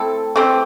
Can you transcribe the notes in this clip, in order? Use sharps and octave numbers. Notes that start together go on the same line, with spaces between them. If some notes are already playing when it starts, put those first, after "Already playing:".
Already playing: A3 C4 E4 A4
E3 A3 C4 G4